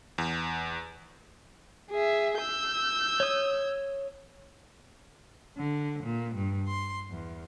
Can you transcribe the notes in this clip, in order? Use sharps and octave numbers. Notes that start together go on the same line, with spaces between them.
E2
G#4 E5
E6 G6
C#5 D#6
D3
A#2
G2
C6
E2